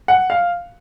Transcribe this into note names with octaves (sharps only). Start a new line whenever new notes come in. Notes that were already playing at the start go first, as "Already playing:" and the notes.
F#5
F5